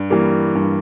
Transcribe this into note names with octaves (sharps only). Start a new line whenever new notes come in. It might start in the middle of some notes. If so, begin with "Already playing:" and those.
Already playing: G2
E3 G3 A#3
G2